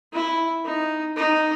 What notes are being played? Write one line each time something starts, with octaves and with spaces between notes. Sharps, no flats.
E4
D#4
D#4